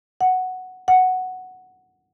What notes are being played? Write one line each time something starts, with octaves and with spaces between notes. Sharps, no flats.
F#5
F#5